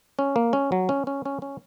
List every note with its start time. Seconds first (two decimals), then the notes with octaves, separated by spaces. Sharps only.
0.19 C#4
0.36 A#3
0.53 C#4
0.72 F#3
0.89 C#4
1.07 C#4
1.25 C#4
1.42 C#4